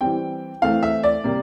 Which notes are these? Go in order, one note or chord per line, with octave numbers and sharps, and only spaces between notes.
E3 G3 C4 G5
E3 A3 C4 F5
E5
D5
C3 G3 A#3